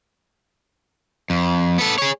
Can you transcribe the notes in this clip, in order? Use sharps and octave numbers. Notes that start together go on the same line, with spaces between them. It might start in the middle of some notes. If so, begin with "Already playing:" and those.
F2
B3 A4
G#4 C#5